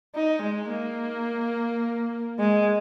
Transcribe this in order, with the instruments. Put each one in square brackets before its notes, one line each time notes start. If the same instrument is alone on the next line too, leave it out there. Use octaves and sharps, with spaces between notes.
[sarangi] D#4
G#3
A#3
G#3